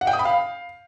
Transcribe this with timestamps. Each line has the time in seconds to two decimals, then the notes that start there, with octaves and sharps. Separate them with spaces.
0.01 F#5
0.07 G5
0.13 D#6
0.19 B5
0.25 F5